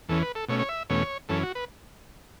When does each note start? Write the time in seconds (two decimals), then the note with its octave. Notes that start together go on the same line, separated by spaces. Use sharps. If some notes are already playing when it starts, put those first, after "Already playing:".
0.08 E2 E3 C#4 A4
0.23 B4
0.35 A4
0.48 B2 A3 C#4 C#5
0.59 C#5
0.69 E5
0.90 E2 B2 A3 C#4 C#5
1.29 F#2 E3 C#4 A4
1.43 F#4
1.55 B4